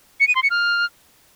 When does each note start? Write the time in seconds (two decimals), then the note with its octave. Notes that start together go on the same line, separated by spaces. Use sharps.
0.20 C#7
0.28 D#7
0.35 C6
0.43 C#7
0.51 F6